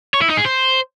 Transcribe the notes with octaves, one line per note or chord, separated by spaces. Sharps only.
C#5
E4
D#4
G#4
C5